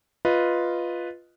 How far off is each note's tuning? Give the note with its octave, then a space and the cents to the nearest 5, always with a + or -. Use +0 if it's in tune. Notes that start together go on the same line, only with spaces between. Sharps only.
F4 +0 B4 +0 D#5 +0